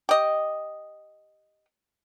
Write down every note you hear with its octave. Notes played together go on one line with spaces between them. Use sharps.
G4 D#5